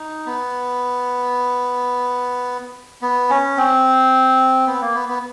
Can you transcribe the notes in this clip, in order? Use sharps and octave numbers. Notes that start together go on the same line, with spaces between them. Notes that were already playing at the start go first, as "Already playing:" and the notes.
Already playing: D#4
B3
B3
C#4
C4
B3
A#3
B3
B3